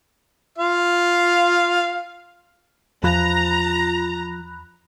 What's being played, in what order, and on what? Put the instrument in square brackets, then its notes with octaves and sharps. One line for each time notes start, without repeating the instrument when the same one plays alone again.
[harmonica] F4 F5
[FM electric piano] E2 B5 F#6 [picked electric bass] F3 [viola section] A#5